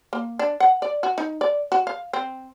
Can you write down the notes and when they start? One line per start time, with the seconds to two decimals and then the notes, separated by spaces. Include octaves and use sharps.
0.13 A#3
0.39 D4
0.60 F#5
0.82 D5
1.03 F#4
1.18 D#4
1.41 D5
1.72 F#4
1.87 F5
2.13 C4